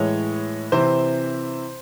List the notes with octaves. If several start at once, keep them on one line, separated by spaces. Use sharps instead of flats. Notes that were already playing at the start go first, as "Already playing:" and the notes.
Already playing: A2 E3 G#3 C#5
C3 E3 C4 C5